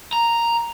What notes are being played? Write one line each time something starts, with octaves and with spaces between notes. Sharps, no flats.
A#5